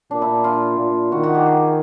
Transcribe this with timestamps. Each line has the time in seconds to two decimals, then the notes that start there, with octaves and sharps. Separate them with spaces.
0.11 A#2 D4
0.22 E4
0.44 F4
0.79 A#2
1.12 D#3 F#4
1.23 F#4
1.34 G4
1.46 G#4